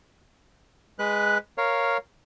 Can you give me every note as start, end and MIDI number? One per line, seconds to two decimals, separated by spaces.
0.99 1.38 56
0.99 1.38 71
0.99 1.38 90
1.58 1.97 70
1.58 1.97 73
1.58 1.97 77